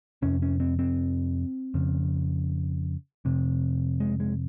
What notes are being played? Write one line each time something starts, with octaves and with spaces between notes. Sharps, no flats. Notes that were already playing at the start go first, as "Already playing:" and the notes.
F2 C3 C#4
C#4
C4
C4
F2 C#3
F2 C3
G#3
G#3